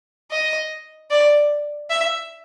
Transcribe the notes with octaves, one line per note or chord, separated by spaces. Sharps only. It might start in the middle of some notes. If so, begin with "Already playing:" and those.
D#5
D5
E5